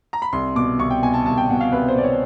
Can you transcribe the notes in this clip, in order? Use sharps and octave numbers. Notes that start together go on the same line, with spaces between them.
A#5
B5
C2 C6
B2 D6
C2 C#6
G5
B2 G#5
A5
C2 A5
G5
B2 F#5
F5
C2 B4
C5
B2 D5
C#5